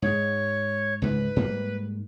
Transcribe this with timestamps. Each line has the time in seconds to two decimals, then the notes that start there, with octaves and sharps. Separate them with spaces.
0.02 G#2 G#3 C#5
1.02 C#2 G#2 B4
1.36 G#2 G3 A#3